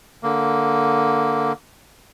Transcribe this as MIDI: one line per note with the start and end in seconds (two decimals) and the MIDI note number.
0.23 1.53 50
0.23 1.53 58